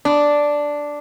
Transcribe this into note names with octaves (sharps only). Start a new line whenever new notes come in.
D4